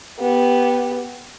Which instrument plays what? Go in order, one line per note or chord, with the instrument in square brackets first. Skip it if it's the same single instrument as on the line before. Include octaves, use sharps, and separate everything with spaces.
[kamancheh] B3 G4